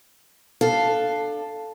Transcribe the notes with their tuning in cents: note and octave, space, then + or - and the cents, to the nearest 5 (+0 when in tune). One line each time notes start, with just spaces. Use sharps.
D4 +20 A4 +0 F5 +0